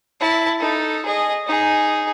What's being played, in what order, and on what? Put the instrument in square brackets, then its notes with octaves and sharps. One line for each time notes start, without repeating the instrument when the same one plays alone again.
[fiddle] E4 A5
D#4 A4
G#4 D#5
D#4 G#4